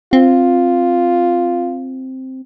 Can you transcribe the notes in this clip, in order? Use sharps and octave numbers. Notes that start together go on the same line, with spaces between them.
C4 F4